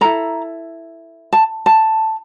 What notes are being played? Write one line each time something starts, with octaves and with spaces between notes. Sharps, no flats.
E4 A4 A#5
A5
A5